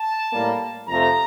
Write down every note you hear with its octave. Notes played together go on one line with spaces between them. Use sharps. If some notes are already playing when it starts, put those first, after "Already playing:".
Already playing: A5
A2 G3 A#3
F2 C3 F3 A3 A#5